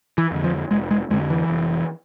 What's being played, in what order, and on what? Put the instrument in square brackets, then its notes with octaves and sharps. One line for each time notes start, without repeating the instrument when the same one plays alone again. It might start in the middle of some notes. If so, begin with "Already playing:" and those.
[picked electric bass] E3
F2 D3
F3
F1 G#3
G#3
F2 D3 G#3
E3
F1